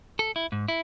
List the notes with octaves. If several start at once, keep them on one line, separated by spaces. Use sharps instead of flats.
A4
E4
G#2
E4